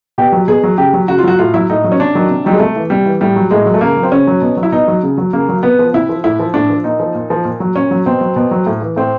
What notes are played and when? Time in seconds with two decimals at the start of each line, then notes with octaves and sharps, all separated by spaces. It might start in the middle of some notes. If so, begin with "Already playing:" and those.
0.18 B2 G4
0.32 F#3
0.48 B2 G#4
0.63 F#3
0.78 C#3 G4
0.93 F#3
1.08 C#3 F#4
1.18 F4
1.24 F#3 F#4
1.39 A2 F4
1.54 F#3 E4
1.69 A2 D#4
1.84 F#3
1.92 C#4
2.00 C3 D4
2.15 D#3 F#3
2.30 C3
2.44 D#3 F#3 G3
2.53 G#3
2.60 C3 A3
2.76 E3
2.90 C3 G3
3.06 E3
3.21 A2 G3
3.36 F#3
3.51 A2 G#3
3.66 F#3
3.74 A3
3.81 C#3 A#3
3.96 F#3
4.03 C4
4.12 C#3 C#4
4.27 F#3
4.42 B2
4.57 F#3
4.63 E4
4.72 B2 D#4
4.88 F#3
5.03 C#3
5.18 F#3
5.33 C#3 A#3
5.49 F#3
5.63 C3 B3
5.79 F3
5.93 C3 E4
6.09 F3
6.24 A2 E4
6.39 F3
6.54 A2 D4
6.70 F3
6.84 A#2 D#4
7.00 F3
7.15 A#2
7.30 F3
7.45 A#2
7.60 F#3
7.75 A#2 C#4
7.91 F#3
8.06 B2 C4
8.21 F#3
8.36 B2
8.51 F#3
8.66 A2
8.82 E3
8.96 A2 C4